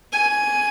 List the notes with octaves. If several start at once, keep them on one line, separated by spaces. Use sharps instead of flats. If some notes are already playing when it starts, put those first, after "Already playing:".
G#5